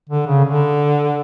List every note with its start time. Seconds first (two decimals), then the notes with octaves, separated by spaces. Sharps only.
0.10 D3
0.27 C#3
0.45 D3